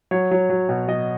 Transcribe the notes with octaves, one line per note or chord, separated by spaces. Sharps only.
F#3 C#5
F#3
F#3
B2
F#3 D#5